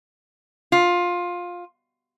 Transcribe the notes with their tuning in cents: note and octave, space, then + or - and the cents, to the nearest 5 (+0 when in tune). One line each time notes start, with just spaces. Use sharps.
F4 +15